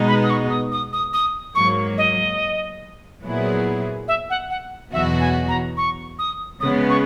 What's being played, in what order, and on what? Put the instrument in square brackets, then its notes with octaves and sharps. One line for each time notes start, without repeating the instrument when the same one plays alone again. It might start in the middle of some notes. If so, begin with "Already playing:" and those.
Already playing: [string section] B2 G#3 B3 D#4
[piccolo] B5
D#6
C#6
D#6
D#6
D#6
D#6
[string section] G#2 F#3 A#3 [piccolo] C#6
[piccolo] D#5
[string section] A#2 F#3 B3 E4 G#4
[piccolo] E5
F#5
F#5
[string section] E2 B2 F#3 B3 F#4 [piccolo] E5
[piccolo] G#5
A#5
C#6
D#6
[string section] C#3 G#3 B3 [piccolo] D#6
[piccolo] C#6